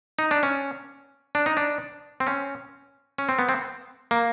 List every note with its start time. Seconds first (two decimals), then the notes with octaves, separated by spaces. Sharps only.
0.19 D#4
0.31 D4
0.43 C#4
1.35 D4
1.46 D#4
1.57 D4
2.20 C4
2.27 C#4
3.18 C#4
3.29 C4
3.39 B3
3.49 C4
4.11 A#3